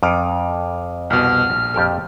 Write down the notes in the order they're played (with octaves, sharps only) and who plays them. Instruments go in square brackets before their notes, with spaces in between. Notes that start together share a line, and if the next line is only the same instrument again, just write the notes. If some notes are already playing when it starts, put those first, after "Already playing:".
[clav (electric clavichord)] F2 [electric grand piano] D6 D#6 F6
[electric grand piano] C2 B2 [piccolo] F6
[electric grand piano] A#1
[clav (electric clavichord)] F2 G4 A4